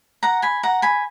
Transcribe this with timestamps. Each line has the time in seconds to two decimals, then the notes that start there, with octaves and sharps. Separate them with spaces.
0.23 F#5 A#5
0.42 G#5 B5
0.63 F#5 A#5
0.82 G#5 B5